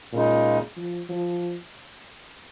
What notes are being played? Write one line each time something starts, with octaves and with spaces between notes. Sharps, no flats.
A#2 C#3 G#3 D#4
F3
F3